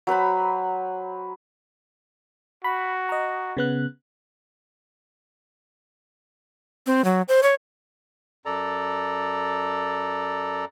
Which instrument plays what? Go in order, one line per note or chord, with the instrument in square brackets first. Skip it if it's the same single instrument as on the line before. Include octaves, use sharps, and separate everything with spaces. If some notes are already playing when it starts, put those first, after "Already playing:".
[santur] F#3 B4 C5 B5
[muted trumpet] F#4 [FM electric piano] B5
[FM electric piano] D#5 A#5
C#3 B3 F#6
[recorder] C4
F#3
C5
C#5
[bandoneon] F#2 A4 D5 A#5